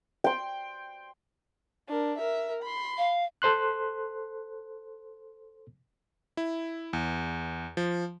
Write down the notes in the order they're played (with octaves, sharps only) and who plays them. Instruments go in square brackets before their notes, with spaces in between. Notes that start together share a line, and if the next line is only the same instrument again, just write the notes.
[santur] G5 C6
[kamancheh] D4 A#4
A#4 E5
B5 C6
[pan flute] F5
[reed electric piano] A4 C5 C6 F#6
[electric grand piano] E4
E2
F3